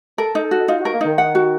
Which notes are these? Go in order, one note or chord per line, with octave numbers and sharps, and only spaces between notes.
A4 A#4
D#4
A4
F#4
D#4 F4
F#4
A#4
A#3
D#3 D#4
F#5
F#4